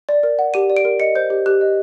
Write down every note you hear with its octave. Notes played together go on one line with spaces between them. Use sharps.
D5
A#4
F#5
G4 D#7
D5
D7
A#4
D#5 C#7
C5 G6
G4
G4 F#6
D#5